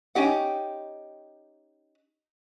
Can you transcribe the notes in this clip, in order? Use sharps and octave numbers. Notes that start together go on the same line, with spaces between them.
C#4 D#4 G4 F#5